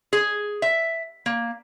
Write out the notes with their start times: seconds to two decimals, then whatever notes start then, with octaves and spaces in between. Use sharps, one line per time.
0.13 G#4
0.62 E5
1.26 A#3